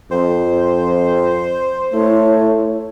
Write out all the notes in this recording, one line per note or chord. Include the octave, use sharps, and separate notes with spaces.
F2 C5
A3 E4 C#5